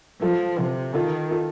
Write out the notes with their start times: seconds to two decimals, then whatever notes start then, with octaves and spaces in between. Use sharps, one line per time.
0.22 F3 F4 A4
0.59 C3
0.94 D#3 F4 A4
1.31 F4 A4